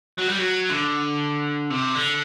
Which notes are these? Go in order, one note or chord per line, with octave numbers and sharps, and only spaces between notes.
F#3
G3
F#3
D3
C3
D3